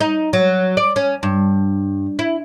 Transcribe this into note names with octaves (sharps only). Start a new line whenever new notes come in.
D#4
F#3
D5
C#4
G2
E4